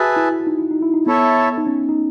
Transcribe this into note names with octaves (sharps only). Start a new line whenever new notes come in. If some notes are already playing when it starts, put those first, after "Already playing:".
Already playing: F#4 G#4 B4 E5 A5
E4
D#4
E4
D#4
E4
D#4
B3 E4 A4 C#5 E5 A5
D#4
C#4
D#4